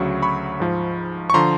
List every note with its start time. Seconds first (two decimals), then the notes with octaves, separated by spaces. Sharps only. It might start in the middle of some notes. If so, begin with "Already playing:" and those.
Already playing: D2 C#3 F#3 C#6
0.22 B5 C#6
0.60 G#2 F3
1.30 C#6
1.34 D3 F3 A#5 C6